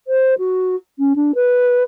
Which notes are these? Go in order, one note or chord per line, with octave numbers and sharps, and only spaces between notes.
C5
F#4
C#4
D4
B4